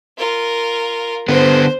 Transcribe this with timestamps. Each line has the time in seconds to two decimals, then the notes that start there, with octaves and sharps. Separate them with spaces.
0.18 F4 A#4
1.28 D3 B3 C5